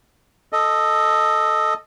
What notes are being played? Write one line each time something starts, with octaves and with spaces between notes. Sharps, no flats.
A4 D#5